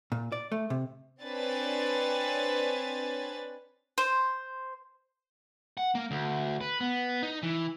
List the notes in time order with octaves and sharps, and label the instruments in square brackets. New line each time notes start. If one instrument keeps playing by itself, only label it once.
[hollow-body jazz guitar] A#2
D5
A3
C3
[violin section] C4 D4 B4 C#5 G#5 A6
[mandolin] C5
[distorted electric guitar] F#5
A#3
D2
B4
B3
D#4
E3